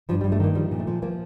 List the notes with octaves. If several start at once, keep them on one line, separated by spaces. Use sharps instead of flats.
G2 F3
G3
G2
A3
D#3 A#3
F3 G3
A#2
A3
F3
F3 A#3